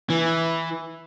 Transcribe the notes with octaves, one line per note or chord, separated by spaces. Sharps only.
E3